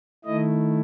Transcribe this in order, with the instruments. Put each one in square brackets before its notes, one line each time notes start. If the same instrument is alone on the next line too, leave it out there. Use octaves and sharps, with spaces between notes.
[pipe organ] D#3 A3 E4 D#5